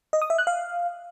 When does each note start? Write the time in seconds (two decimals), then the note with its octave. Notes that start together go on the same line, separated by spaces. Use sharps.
0.13 D#5
0.22 D#6
0.30 E5
0.38 F#6
0.47 F5